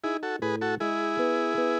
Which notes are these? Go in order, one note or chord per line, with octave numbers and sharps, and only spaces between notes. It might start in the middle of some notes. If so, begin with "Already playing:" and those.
D#4 E4 G#4
F#4 A4
A2 G#4 B4
F#4 A4
G#3 E4 G#4
B3
B3